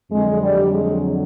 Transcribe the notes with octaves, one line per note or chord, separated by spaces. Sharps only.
F2 D3 F#3 G#3
G3
G#3